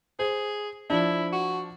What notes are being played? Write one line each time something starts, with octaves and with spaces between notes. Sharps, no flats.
G#4 C5
F3 D4 E4
F#4